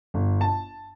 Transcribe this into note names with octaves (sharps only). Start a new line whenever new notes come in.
G1
A5